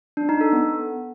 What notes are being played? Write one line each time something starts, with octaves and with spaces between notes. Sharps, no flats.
D4
D#4
A4
B3